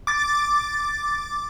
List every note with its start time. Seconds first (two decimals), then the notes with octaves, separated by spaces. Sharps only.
0.07 D6 A6